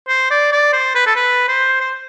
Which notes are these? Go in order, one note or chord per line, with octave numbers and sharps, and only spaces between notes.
C5
D5
D5
C5
B4
A4
B4
C5
C5